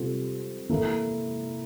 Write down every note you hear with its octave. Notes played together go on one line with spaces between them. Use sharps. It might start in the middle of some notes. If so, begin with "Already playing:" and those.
Already playing: C3 G3 C4 F4 A4
E3 A#3 E4 A4